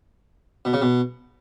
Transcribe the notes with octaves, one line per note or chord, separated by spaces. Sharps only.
B2
C#3
B2